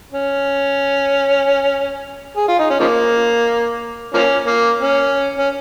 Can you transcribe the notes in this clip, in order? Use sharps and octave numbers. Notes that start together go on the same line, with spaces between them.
C#4
G#4
F4
D#4
C#4
C#3 F3 A#3
F3 A#3 C#4
A#3
C#4
C#4